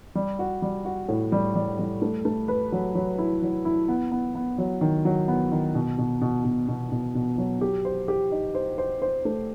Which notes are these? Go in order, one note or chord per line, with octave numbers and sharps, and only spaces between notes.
G3
F#4
G3
F#4
A2
G3
G3
G3
A3
A3
B4
F#3
F#3
E4
F#3
E4
B3
B3
B3
F#3
D#3
F#3
B3
D#3
B2
B2
B2
B2
B2
B2
B2
F#3
G4
C5
G4
D#4
C5
C5
C5
A3